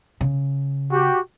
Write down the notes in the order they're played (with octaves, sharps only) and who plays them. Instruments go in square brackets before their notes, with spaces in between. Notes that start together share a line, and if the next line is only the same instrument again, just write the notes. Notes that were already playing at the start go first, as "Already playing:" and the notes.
[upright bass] C#3
[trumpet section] F#4 G4